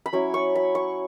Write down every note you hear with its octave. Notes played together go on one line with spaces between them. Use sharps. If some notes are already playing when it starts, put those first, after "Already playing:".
B5
F#3 C#4 E4 C#6
C#6
B5
C#6